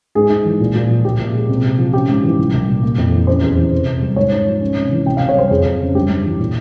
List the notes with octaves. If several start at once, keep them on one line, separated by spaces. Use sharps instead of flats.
G#2 G#4
G#2
E3
A#2
A#2
F3
A#2 G4
A#2
G#3
C3
C3
F3
C#4 G4
G#2
E3
C2
C2
A#2
A#3
F2
E3
C#4 C5
E2
E3
C3
C3
G3
G#2 C#5
G#2
F3
C#4
C3
E3
C3 G5
C3 F5
C#5
G3 C5
F2 G#4
F2
C#3
G2 G4
G2
E3
A#2